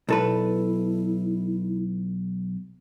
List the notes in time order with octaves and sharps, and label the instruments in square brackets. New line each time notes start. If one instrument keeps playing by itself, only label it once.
[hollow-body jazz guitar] B1 A4 B4 [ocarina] E4